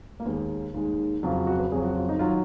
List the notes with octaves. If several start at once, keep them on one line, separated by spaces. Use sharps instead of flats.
A#3
D#2 D#3 G#3 B3
D#2 D#3 G#3
F2 C#3 F#3 F4
F4
F#4
B4
F2 C#3 F#3 G#4
F#4
F4
D#4
D#3 F#3 F4